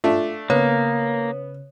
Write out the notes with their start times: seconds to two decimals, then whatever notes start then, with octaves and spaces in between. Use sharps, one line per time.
0.04 A3 D4 F4
0.50 C#3 A#3 B3 C#5